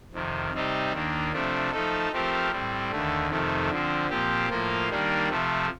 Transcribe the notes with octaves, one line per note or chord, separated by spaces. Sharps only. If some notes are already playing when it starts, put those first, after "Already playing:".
F2 C3 D#3
C3 G3 C4 D#4 G4
D#2 D#3 A#3 D4
C3 F3 A3 D4
F3 A3 D#4 A4
F3 A3 C4 G4 A#4
A2 G3 C4
D#2 D3 A3
F2 C3 D#3 A3
D3 F3 C4
A#2 F3 C4 G4
A2 F3 A#3 F4
D#3 G3 A#3 D4
C3 F3 A3